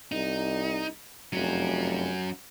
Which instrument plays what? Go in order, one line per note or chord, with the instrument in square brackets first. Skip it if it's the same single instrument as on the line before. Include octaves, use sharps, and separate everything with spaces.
[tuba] C2 [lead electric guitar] D#4
[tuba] F1 [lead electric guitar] F#3 C#4